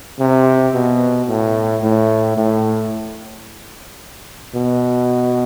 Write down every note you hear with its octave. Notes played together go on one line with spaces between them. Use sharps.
C3
B2
A2
A2
A2
B2